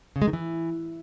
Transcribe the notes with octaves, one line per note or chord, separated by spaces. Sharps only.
C#3
G#3
D#3
E3